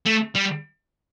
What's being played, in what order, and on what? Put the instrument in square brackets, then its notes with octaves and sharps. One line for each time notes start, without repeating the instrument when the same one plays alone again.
[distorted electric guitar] A3
G3